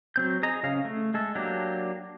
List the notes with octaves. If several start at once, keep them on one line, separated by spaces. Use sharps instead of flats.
F#3 C4 G6
G#4 D#5 A#5
C#3 C#4 F5
A3
G#3 A4
F#3 A#3 D4 G4